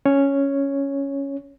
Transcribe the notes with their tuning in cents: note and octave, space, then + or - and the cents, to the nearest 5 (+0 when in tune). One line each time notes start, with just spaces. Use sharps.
C#4 +0 C#5 +0